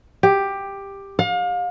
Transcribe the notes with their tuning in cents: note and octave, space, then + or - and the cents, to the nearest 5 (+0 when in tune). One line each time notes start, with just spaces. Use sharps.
G4 +10
F5 +35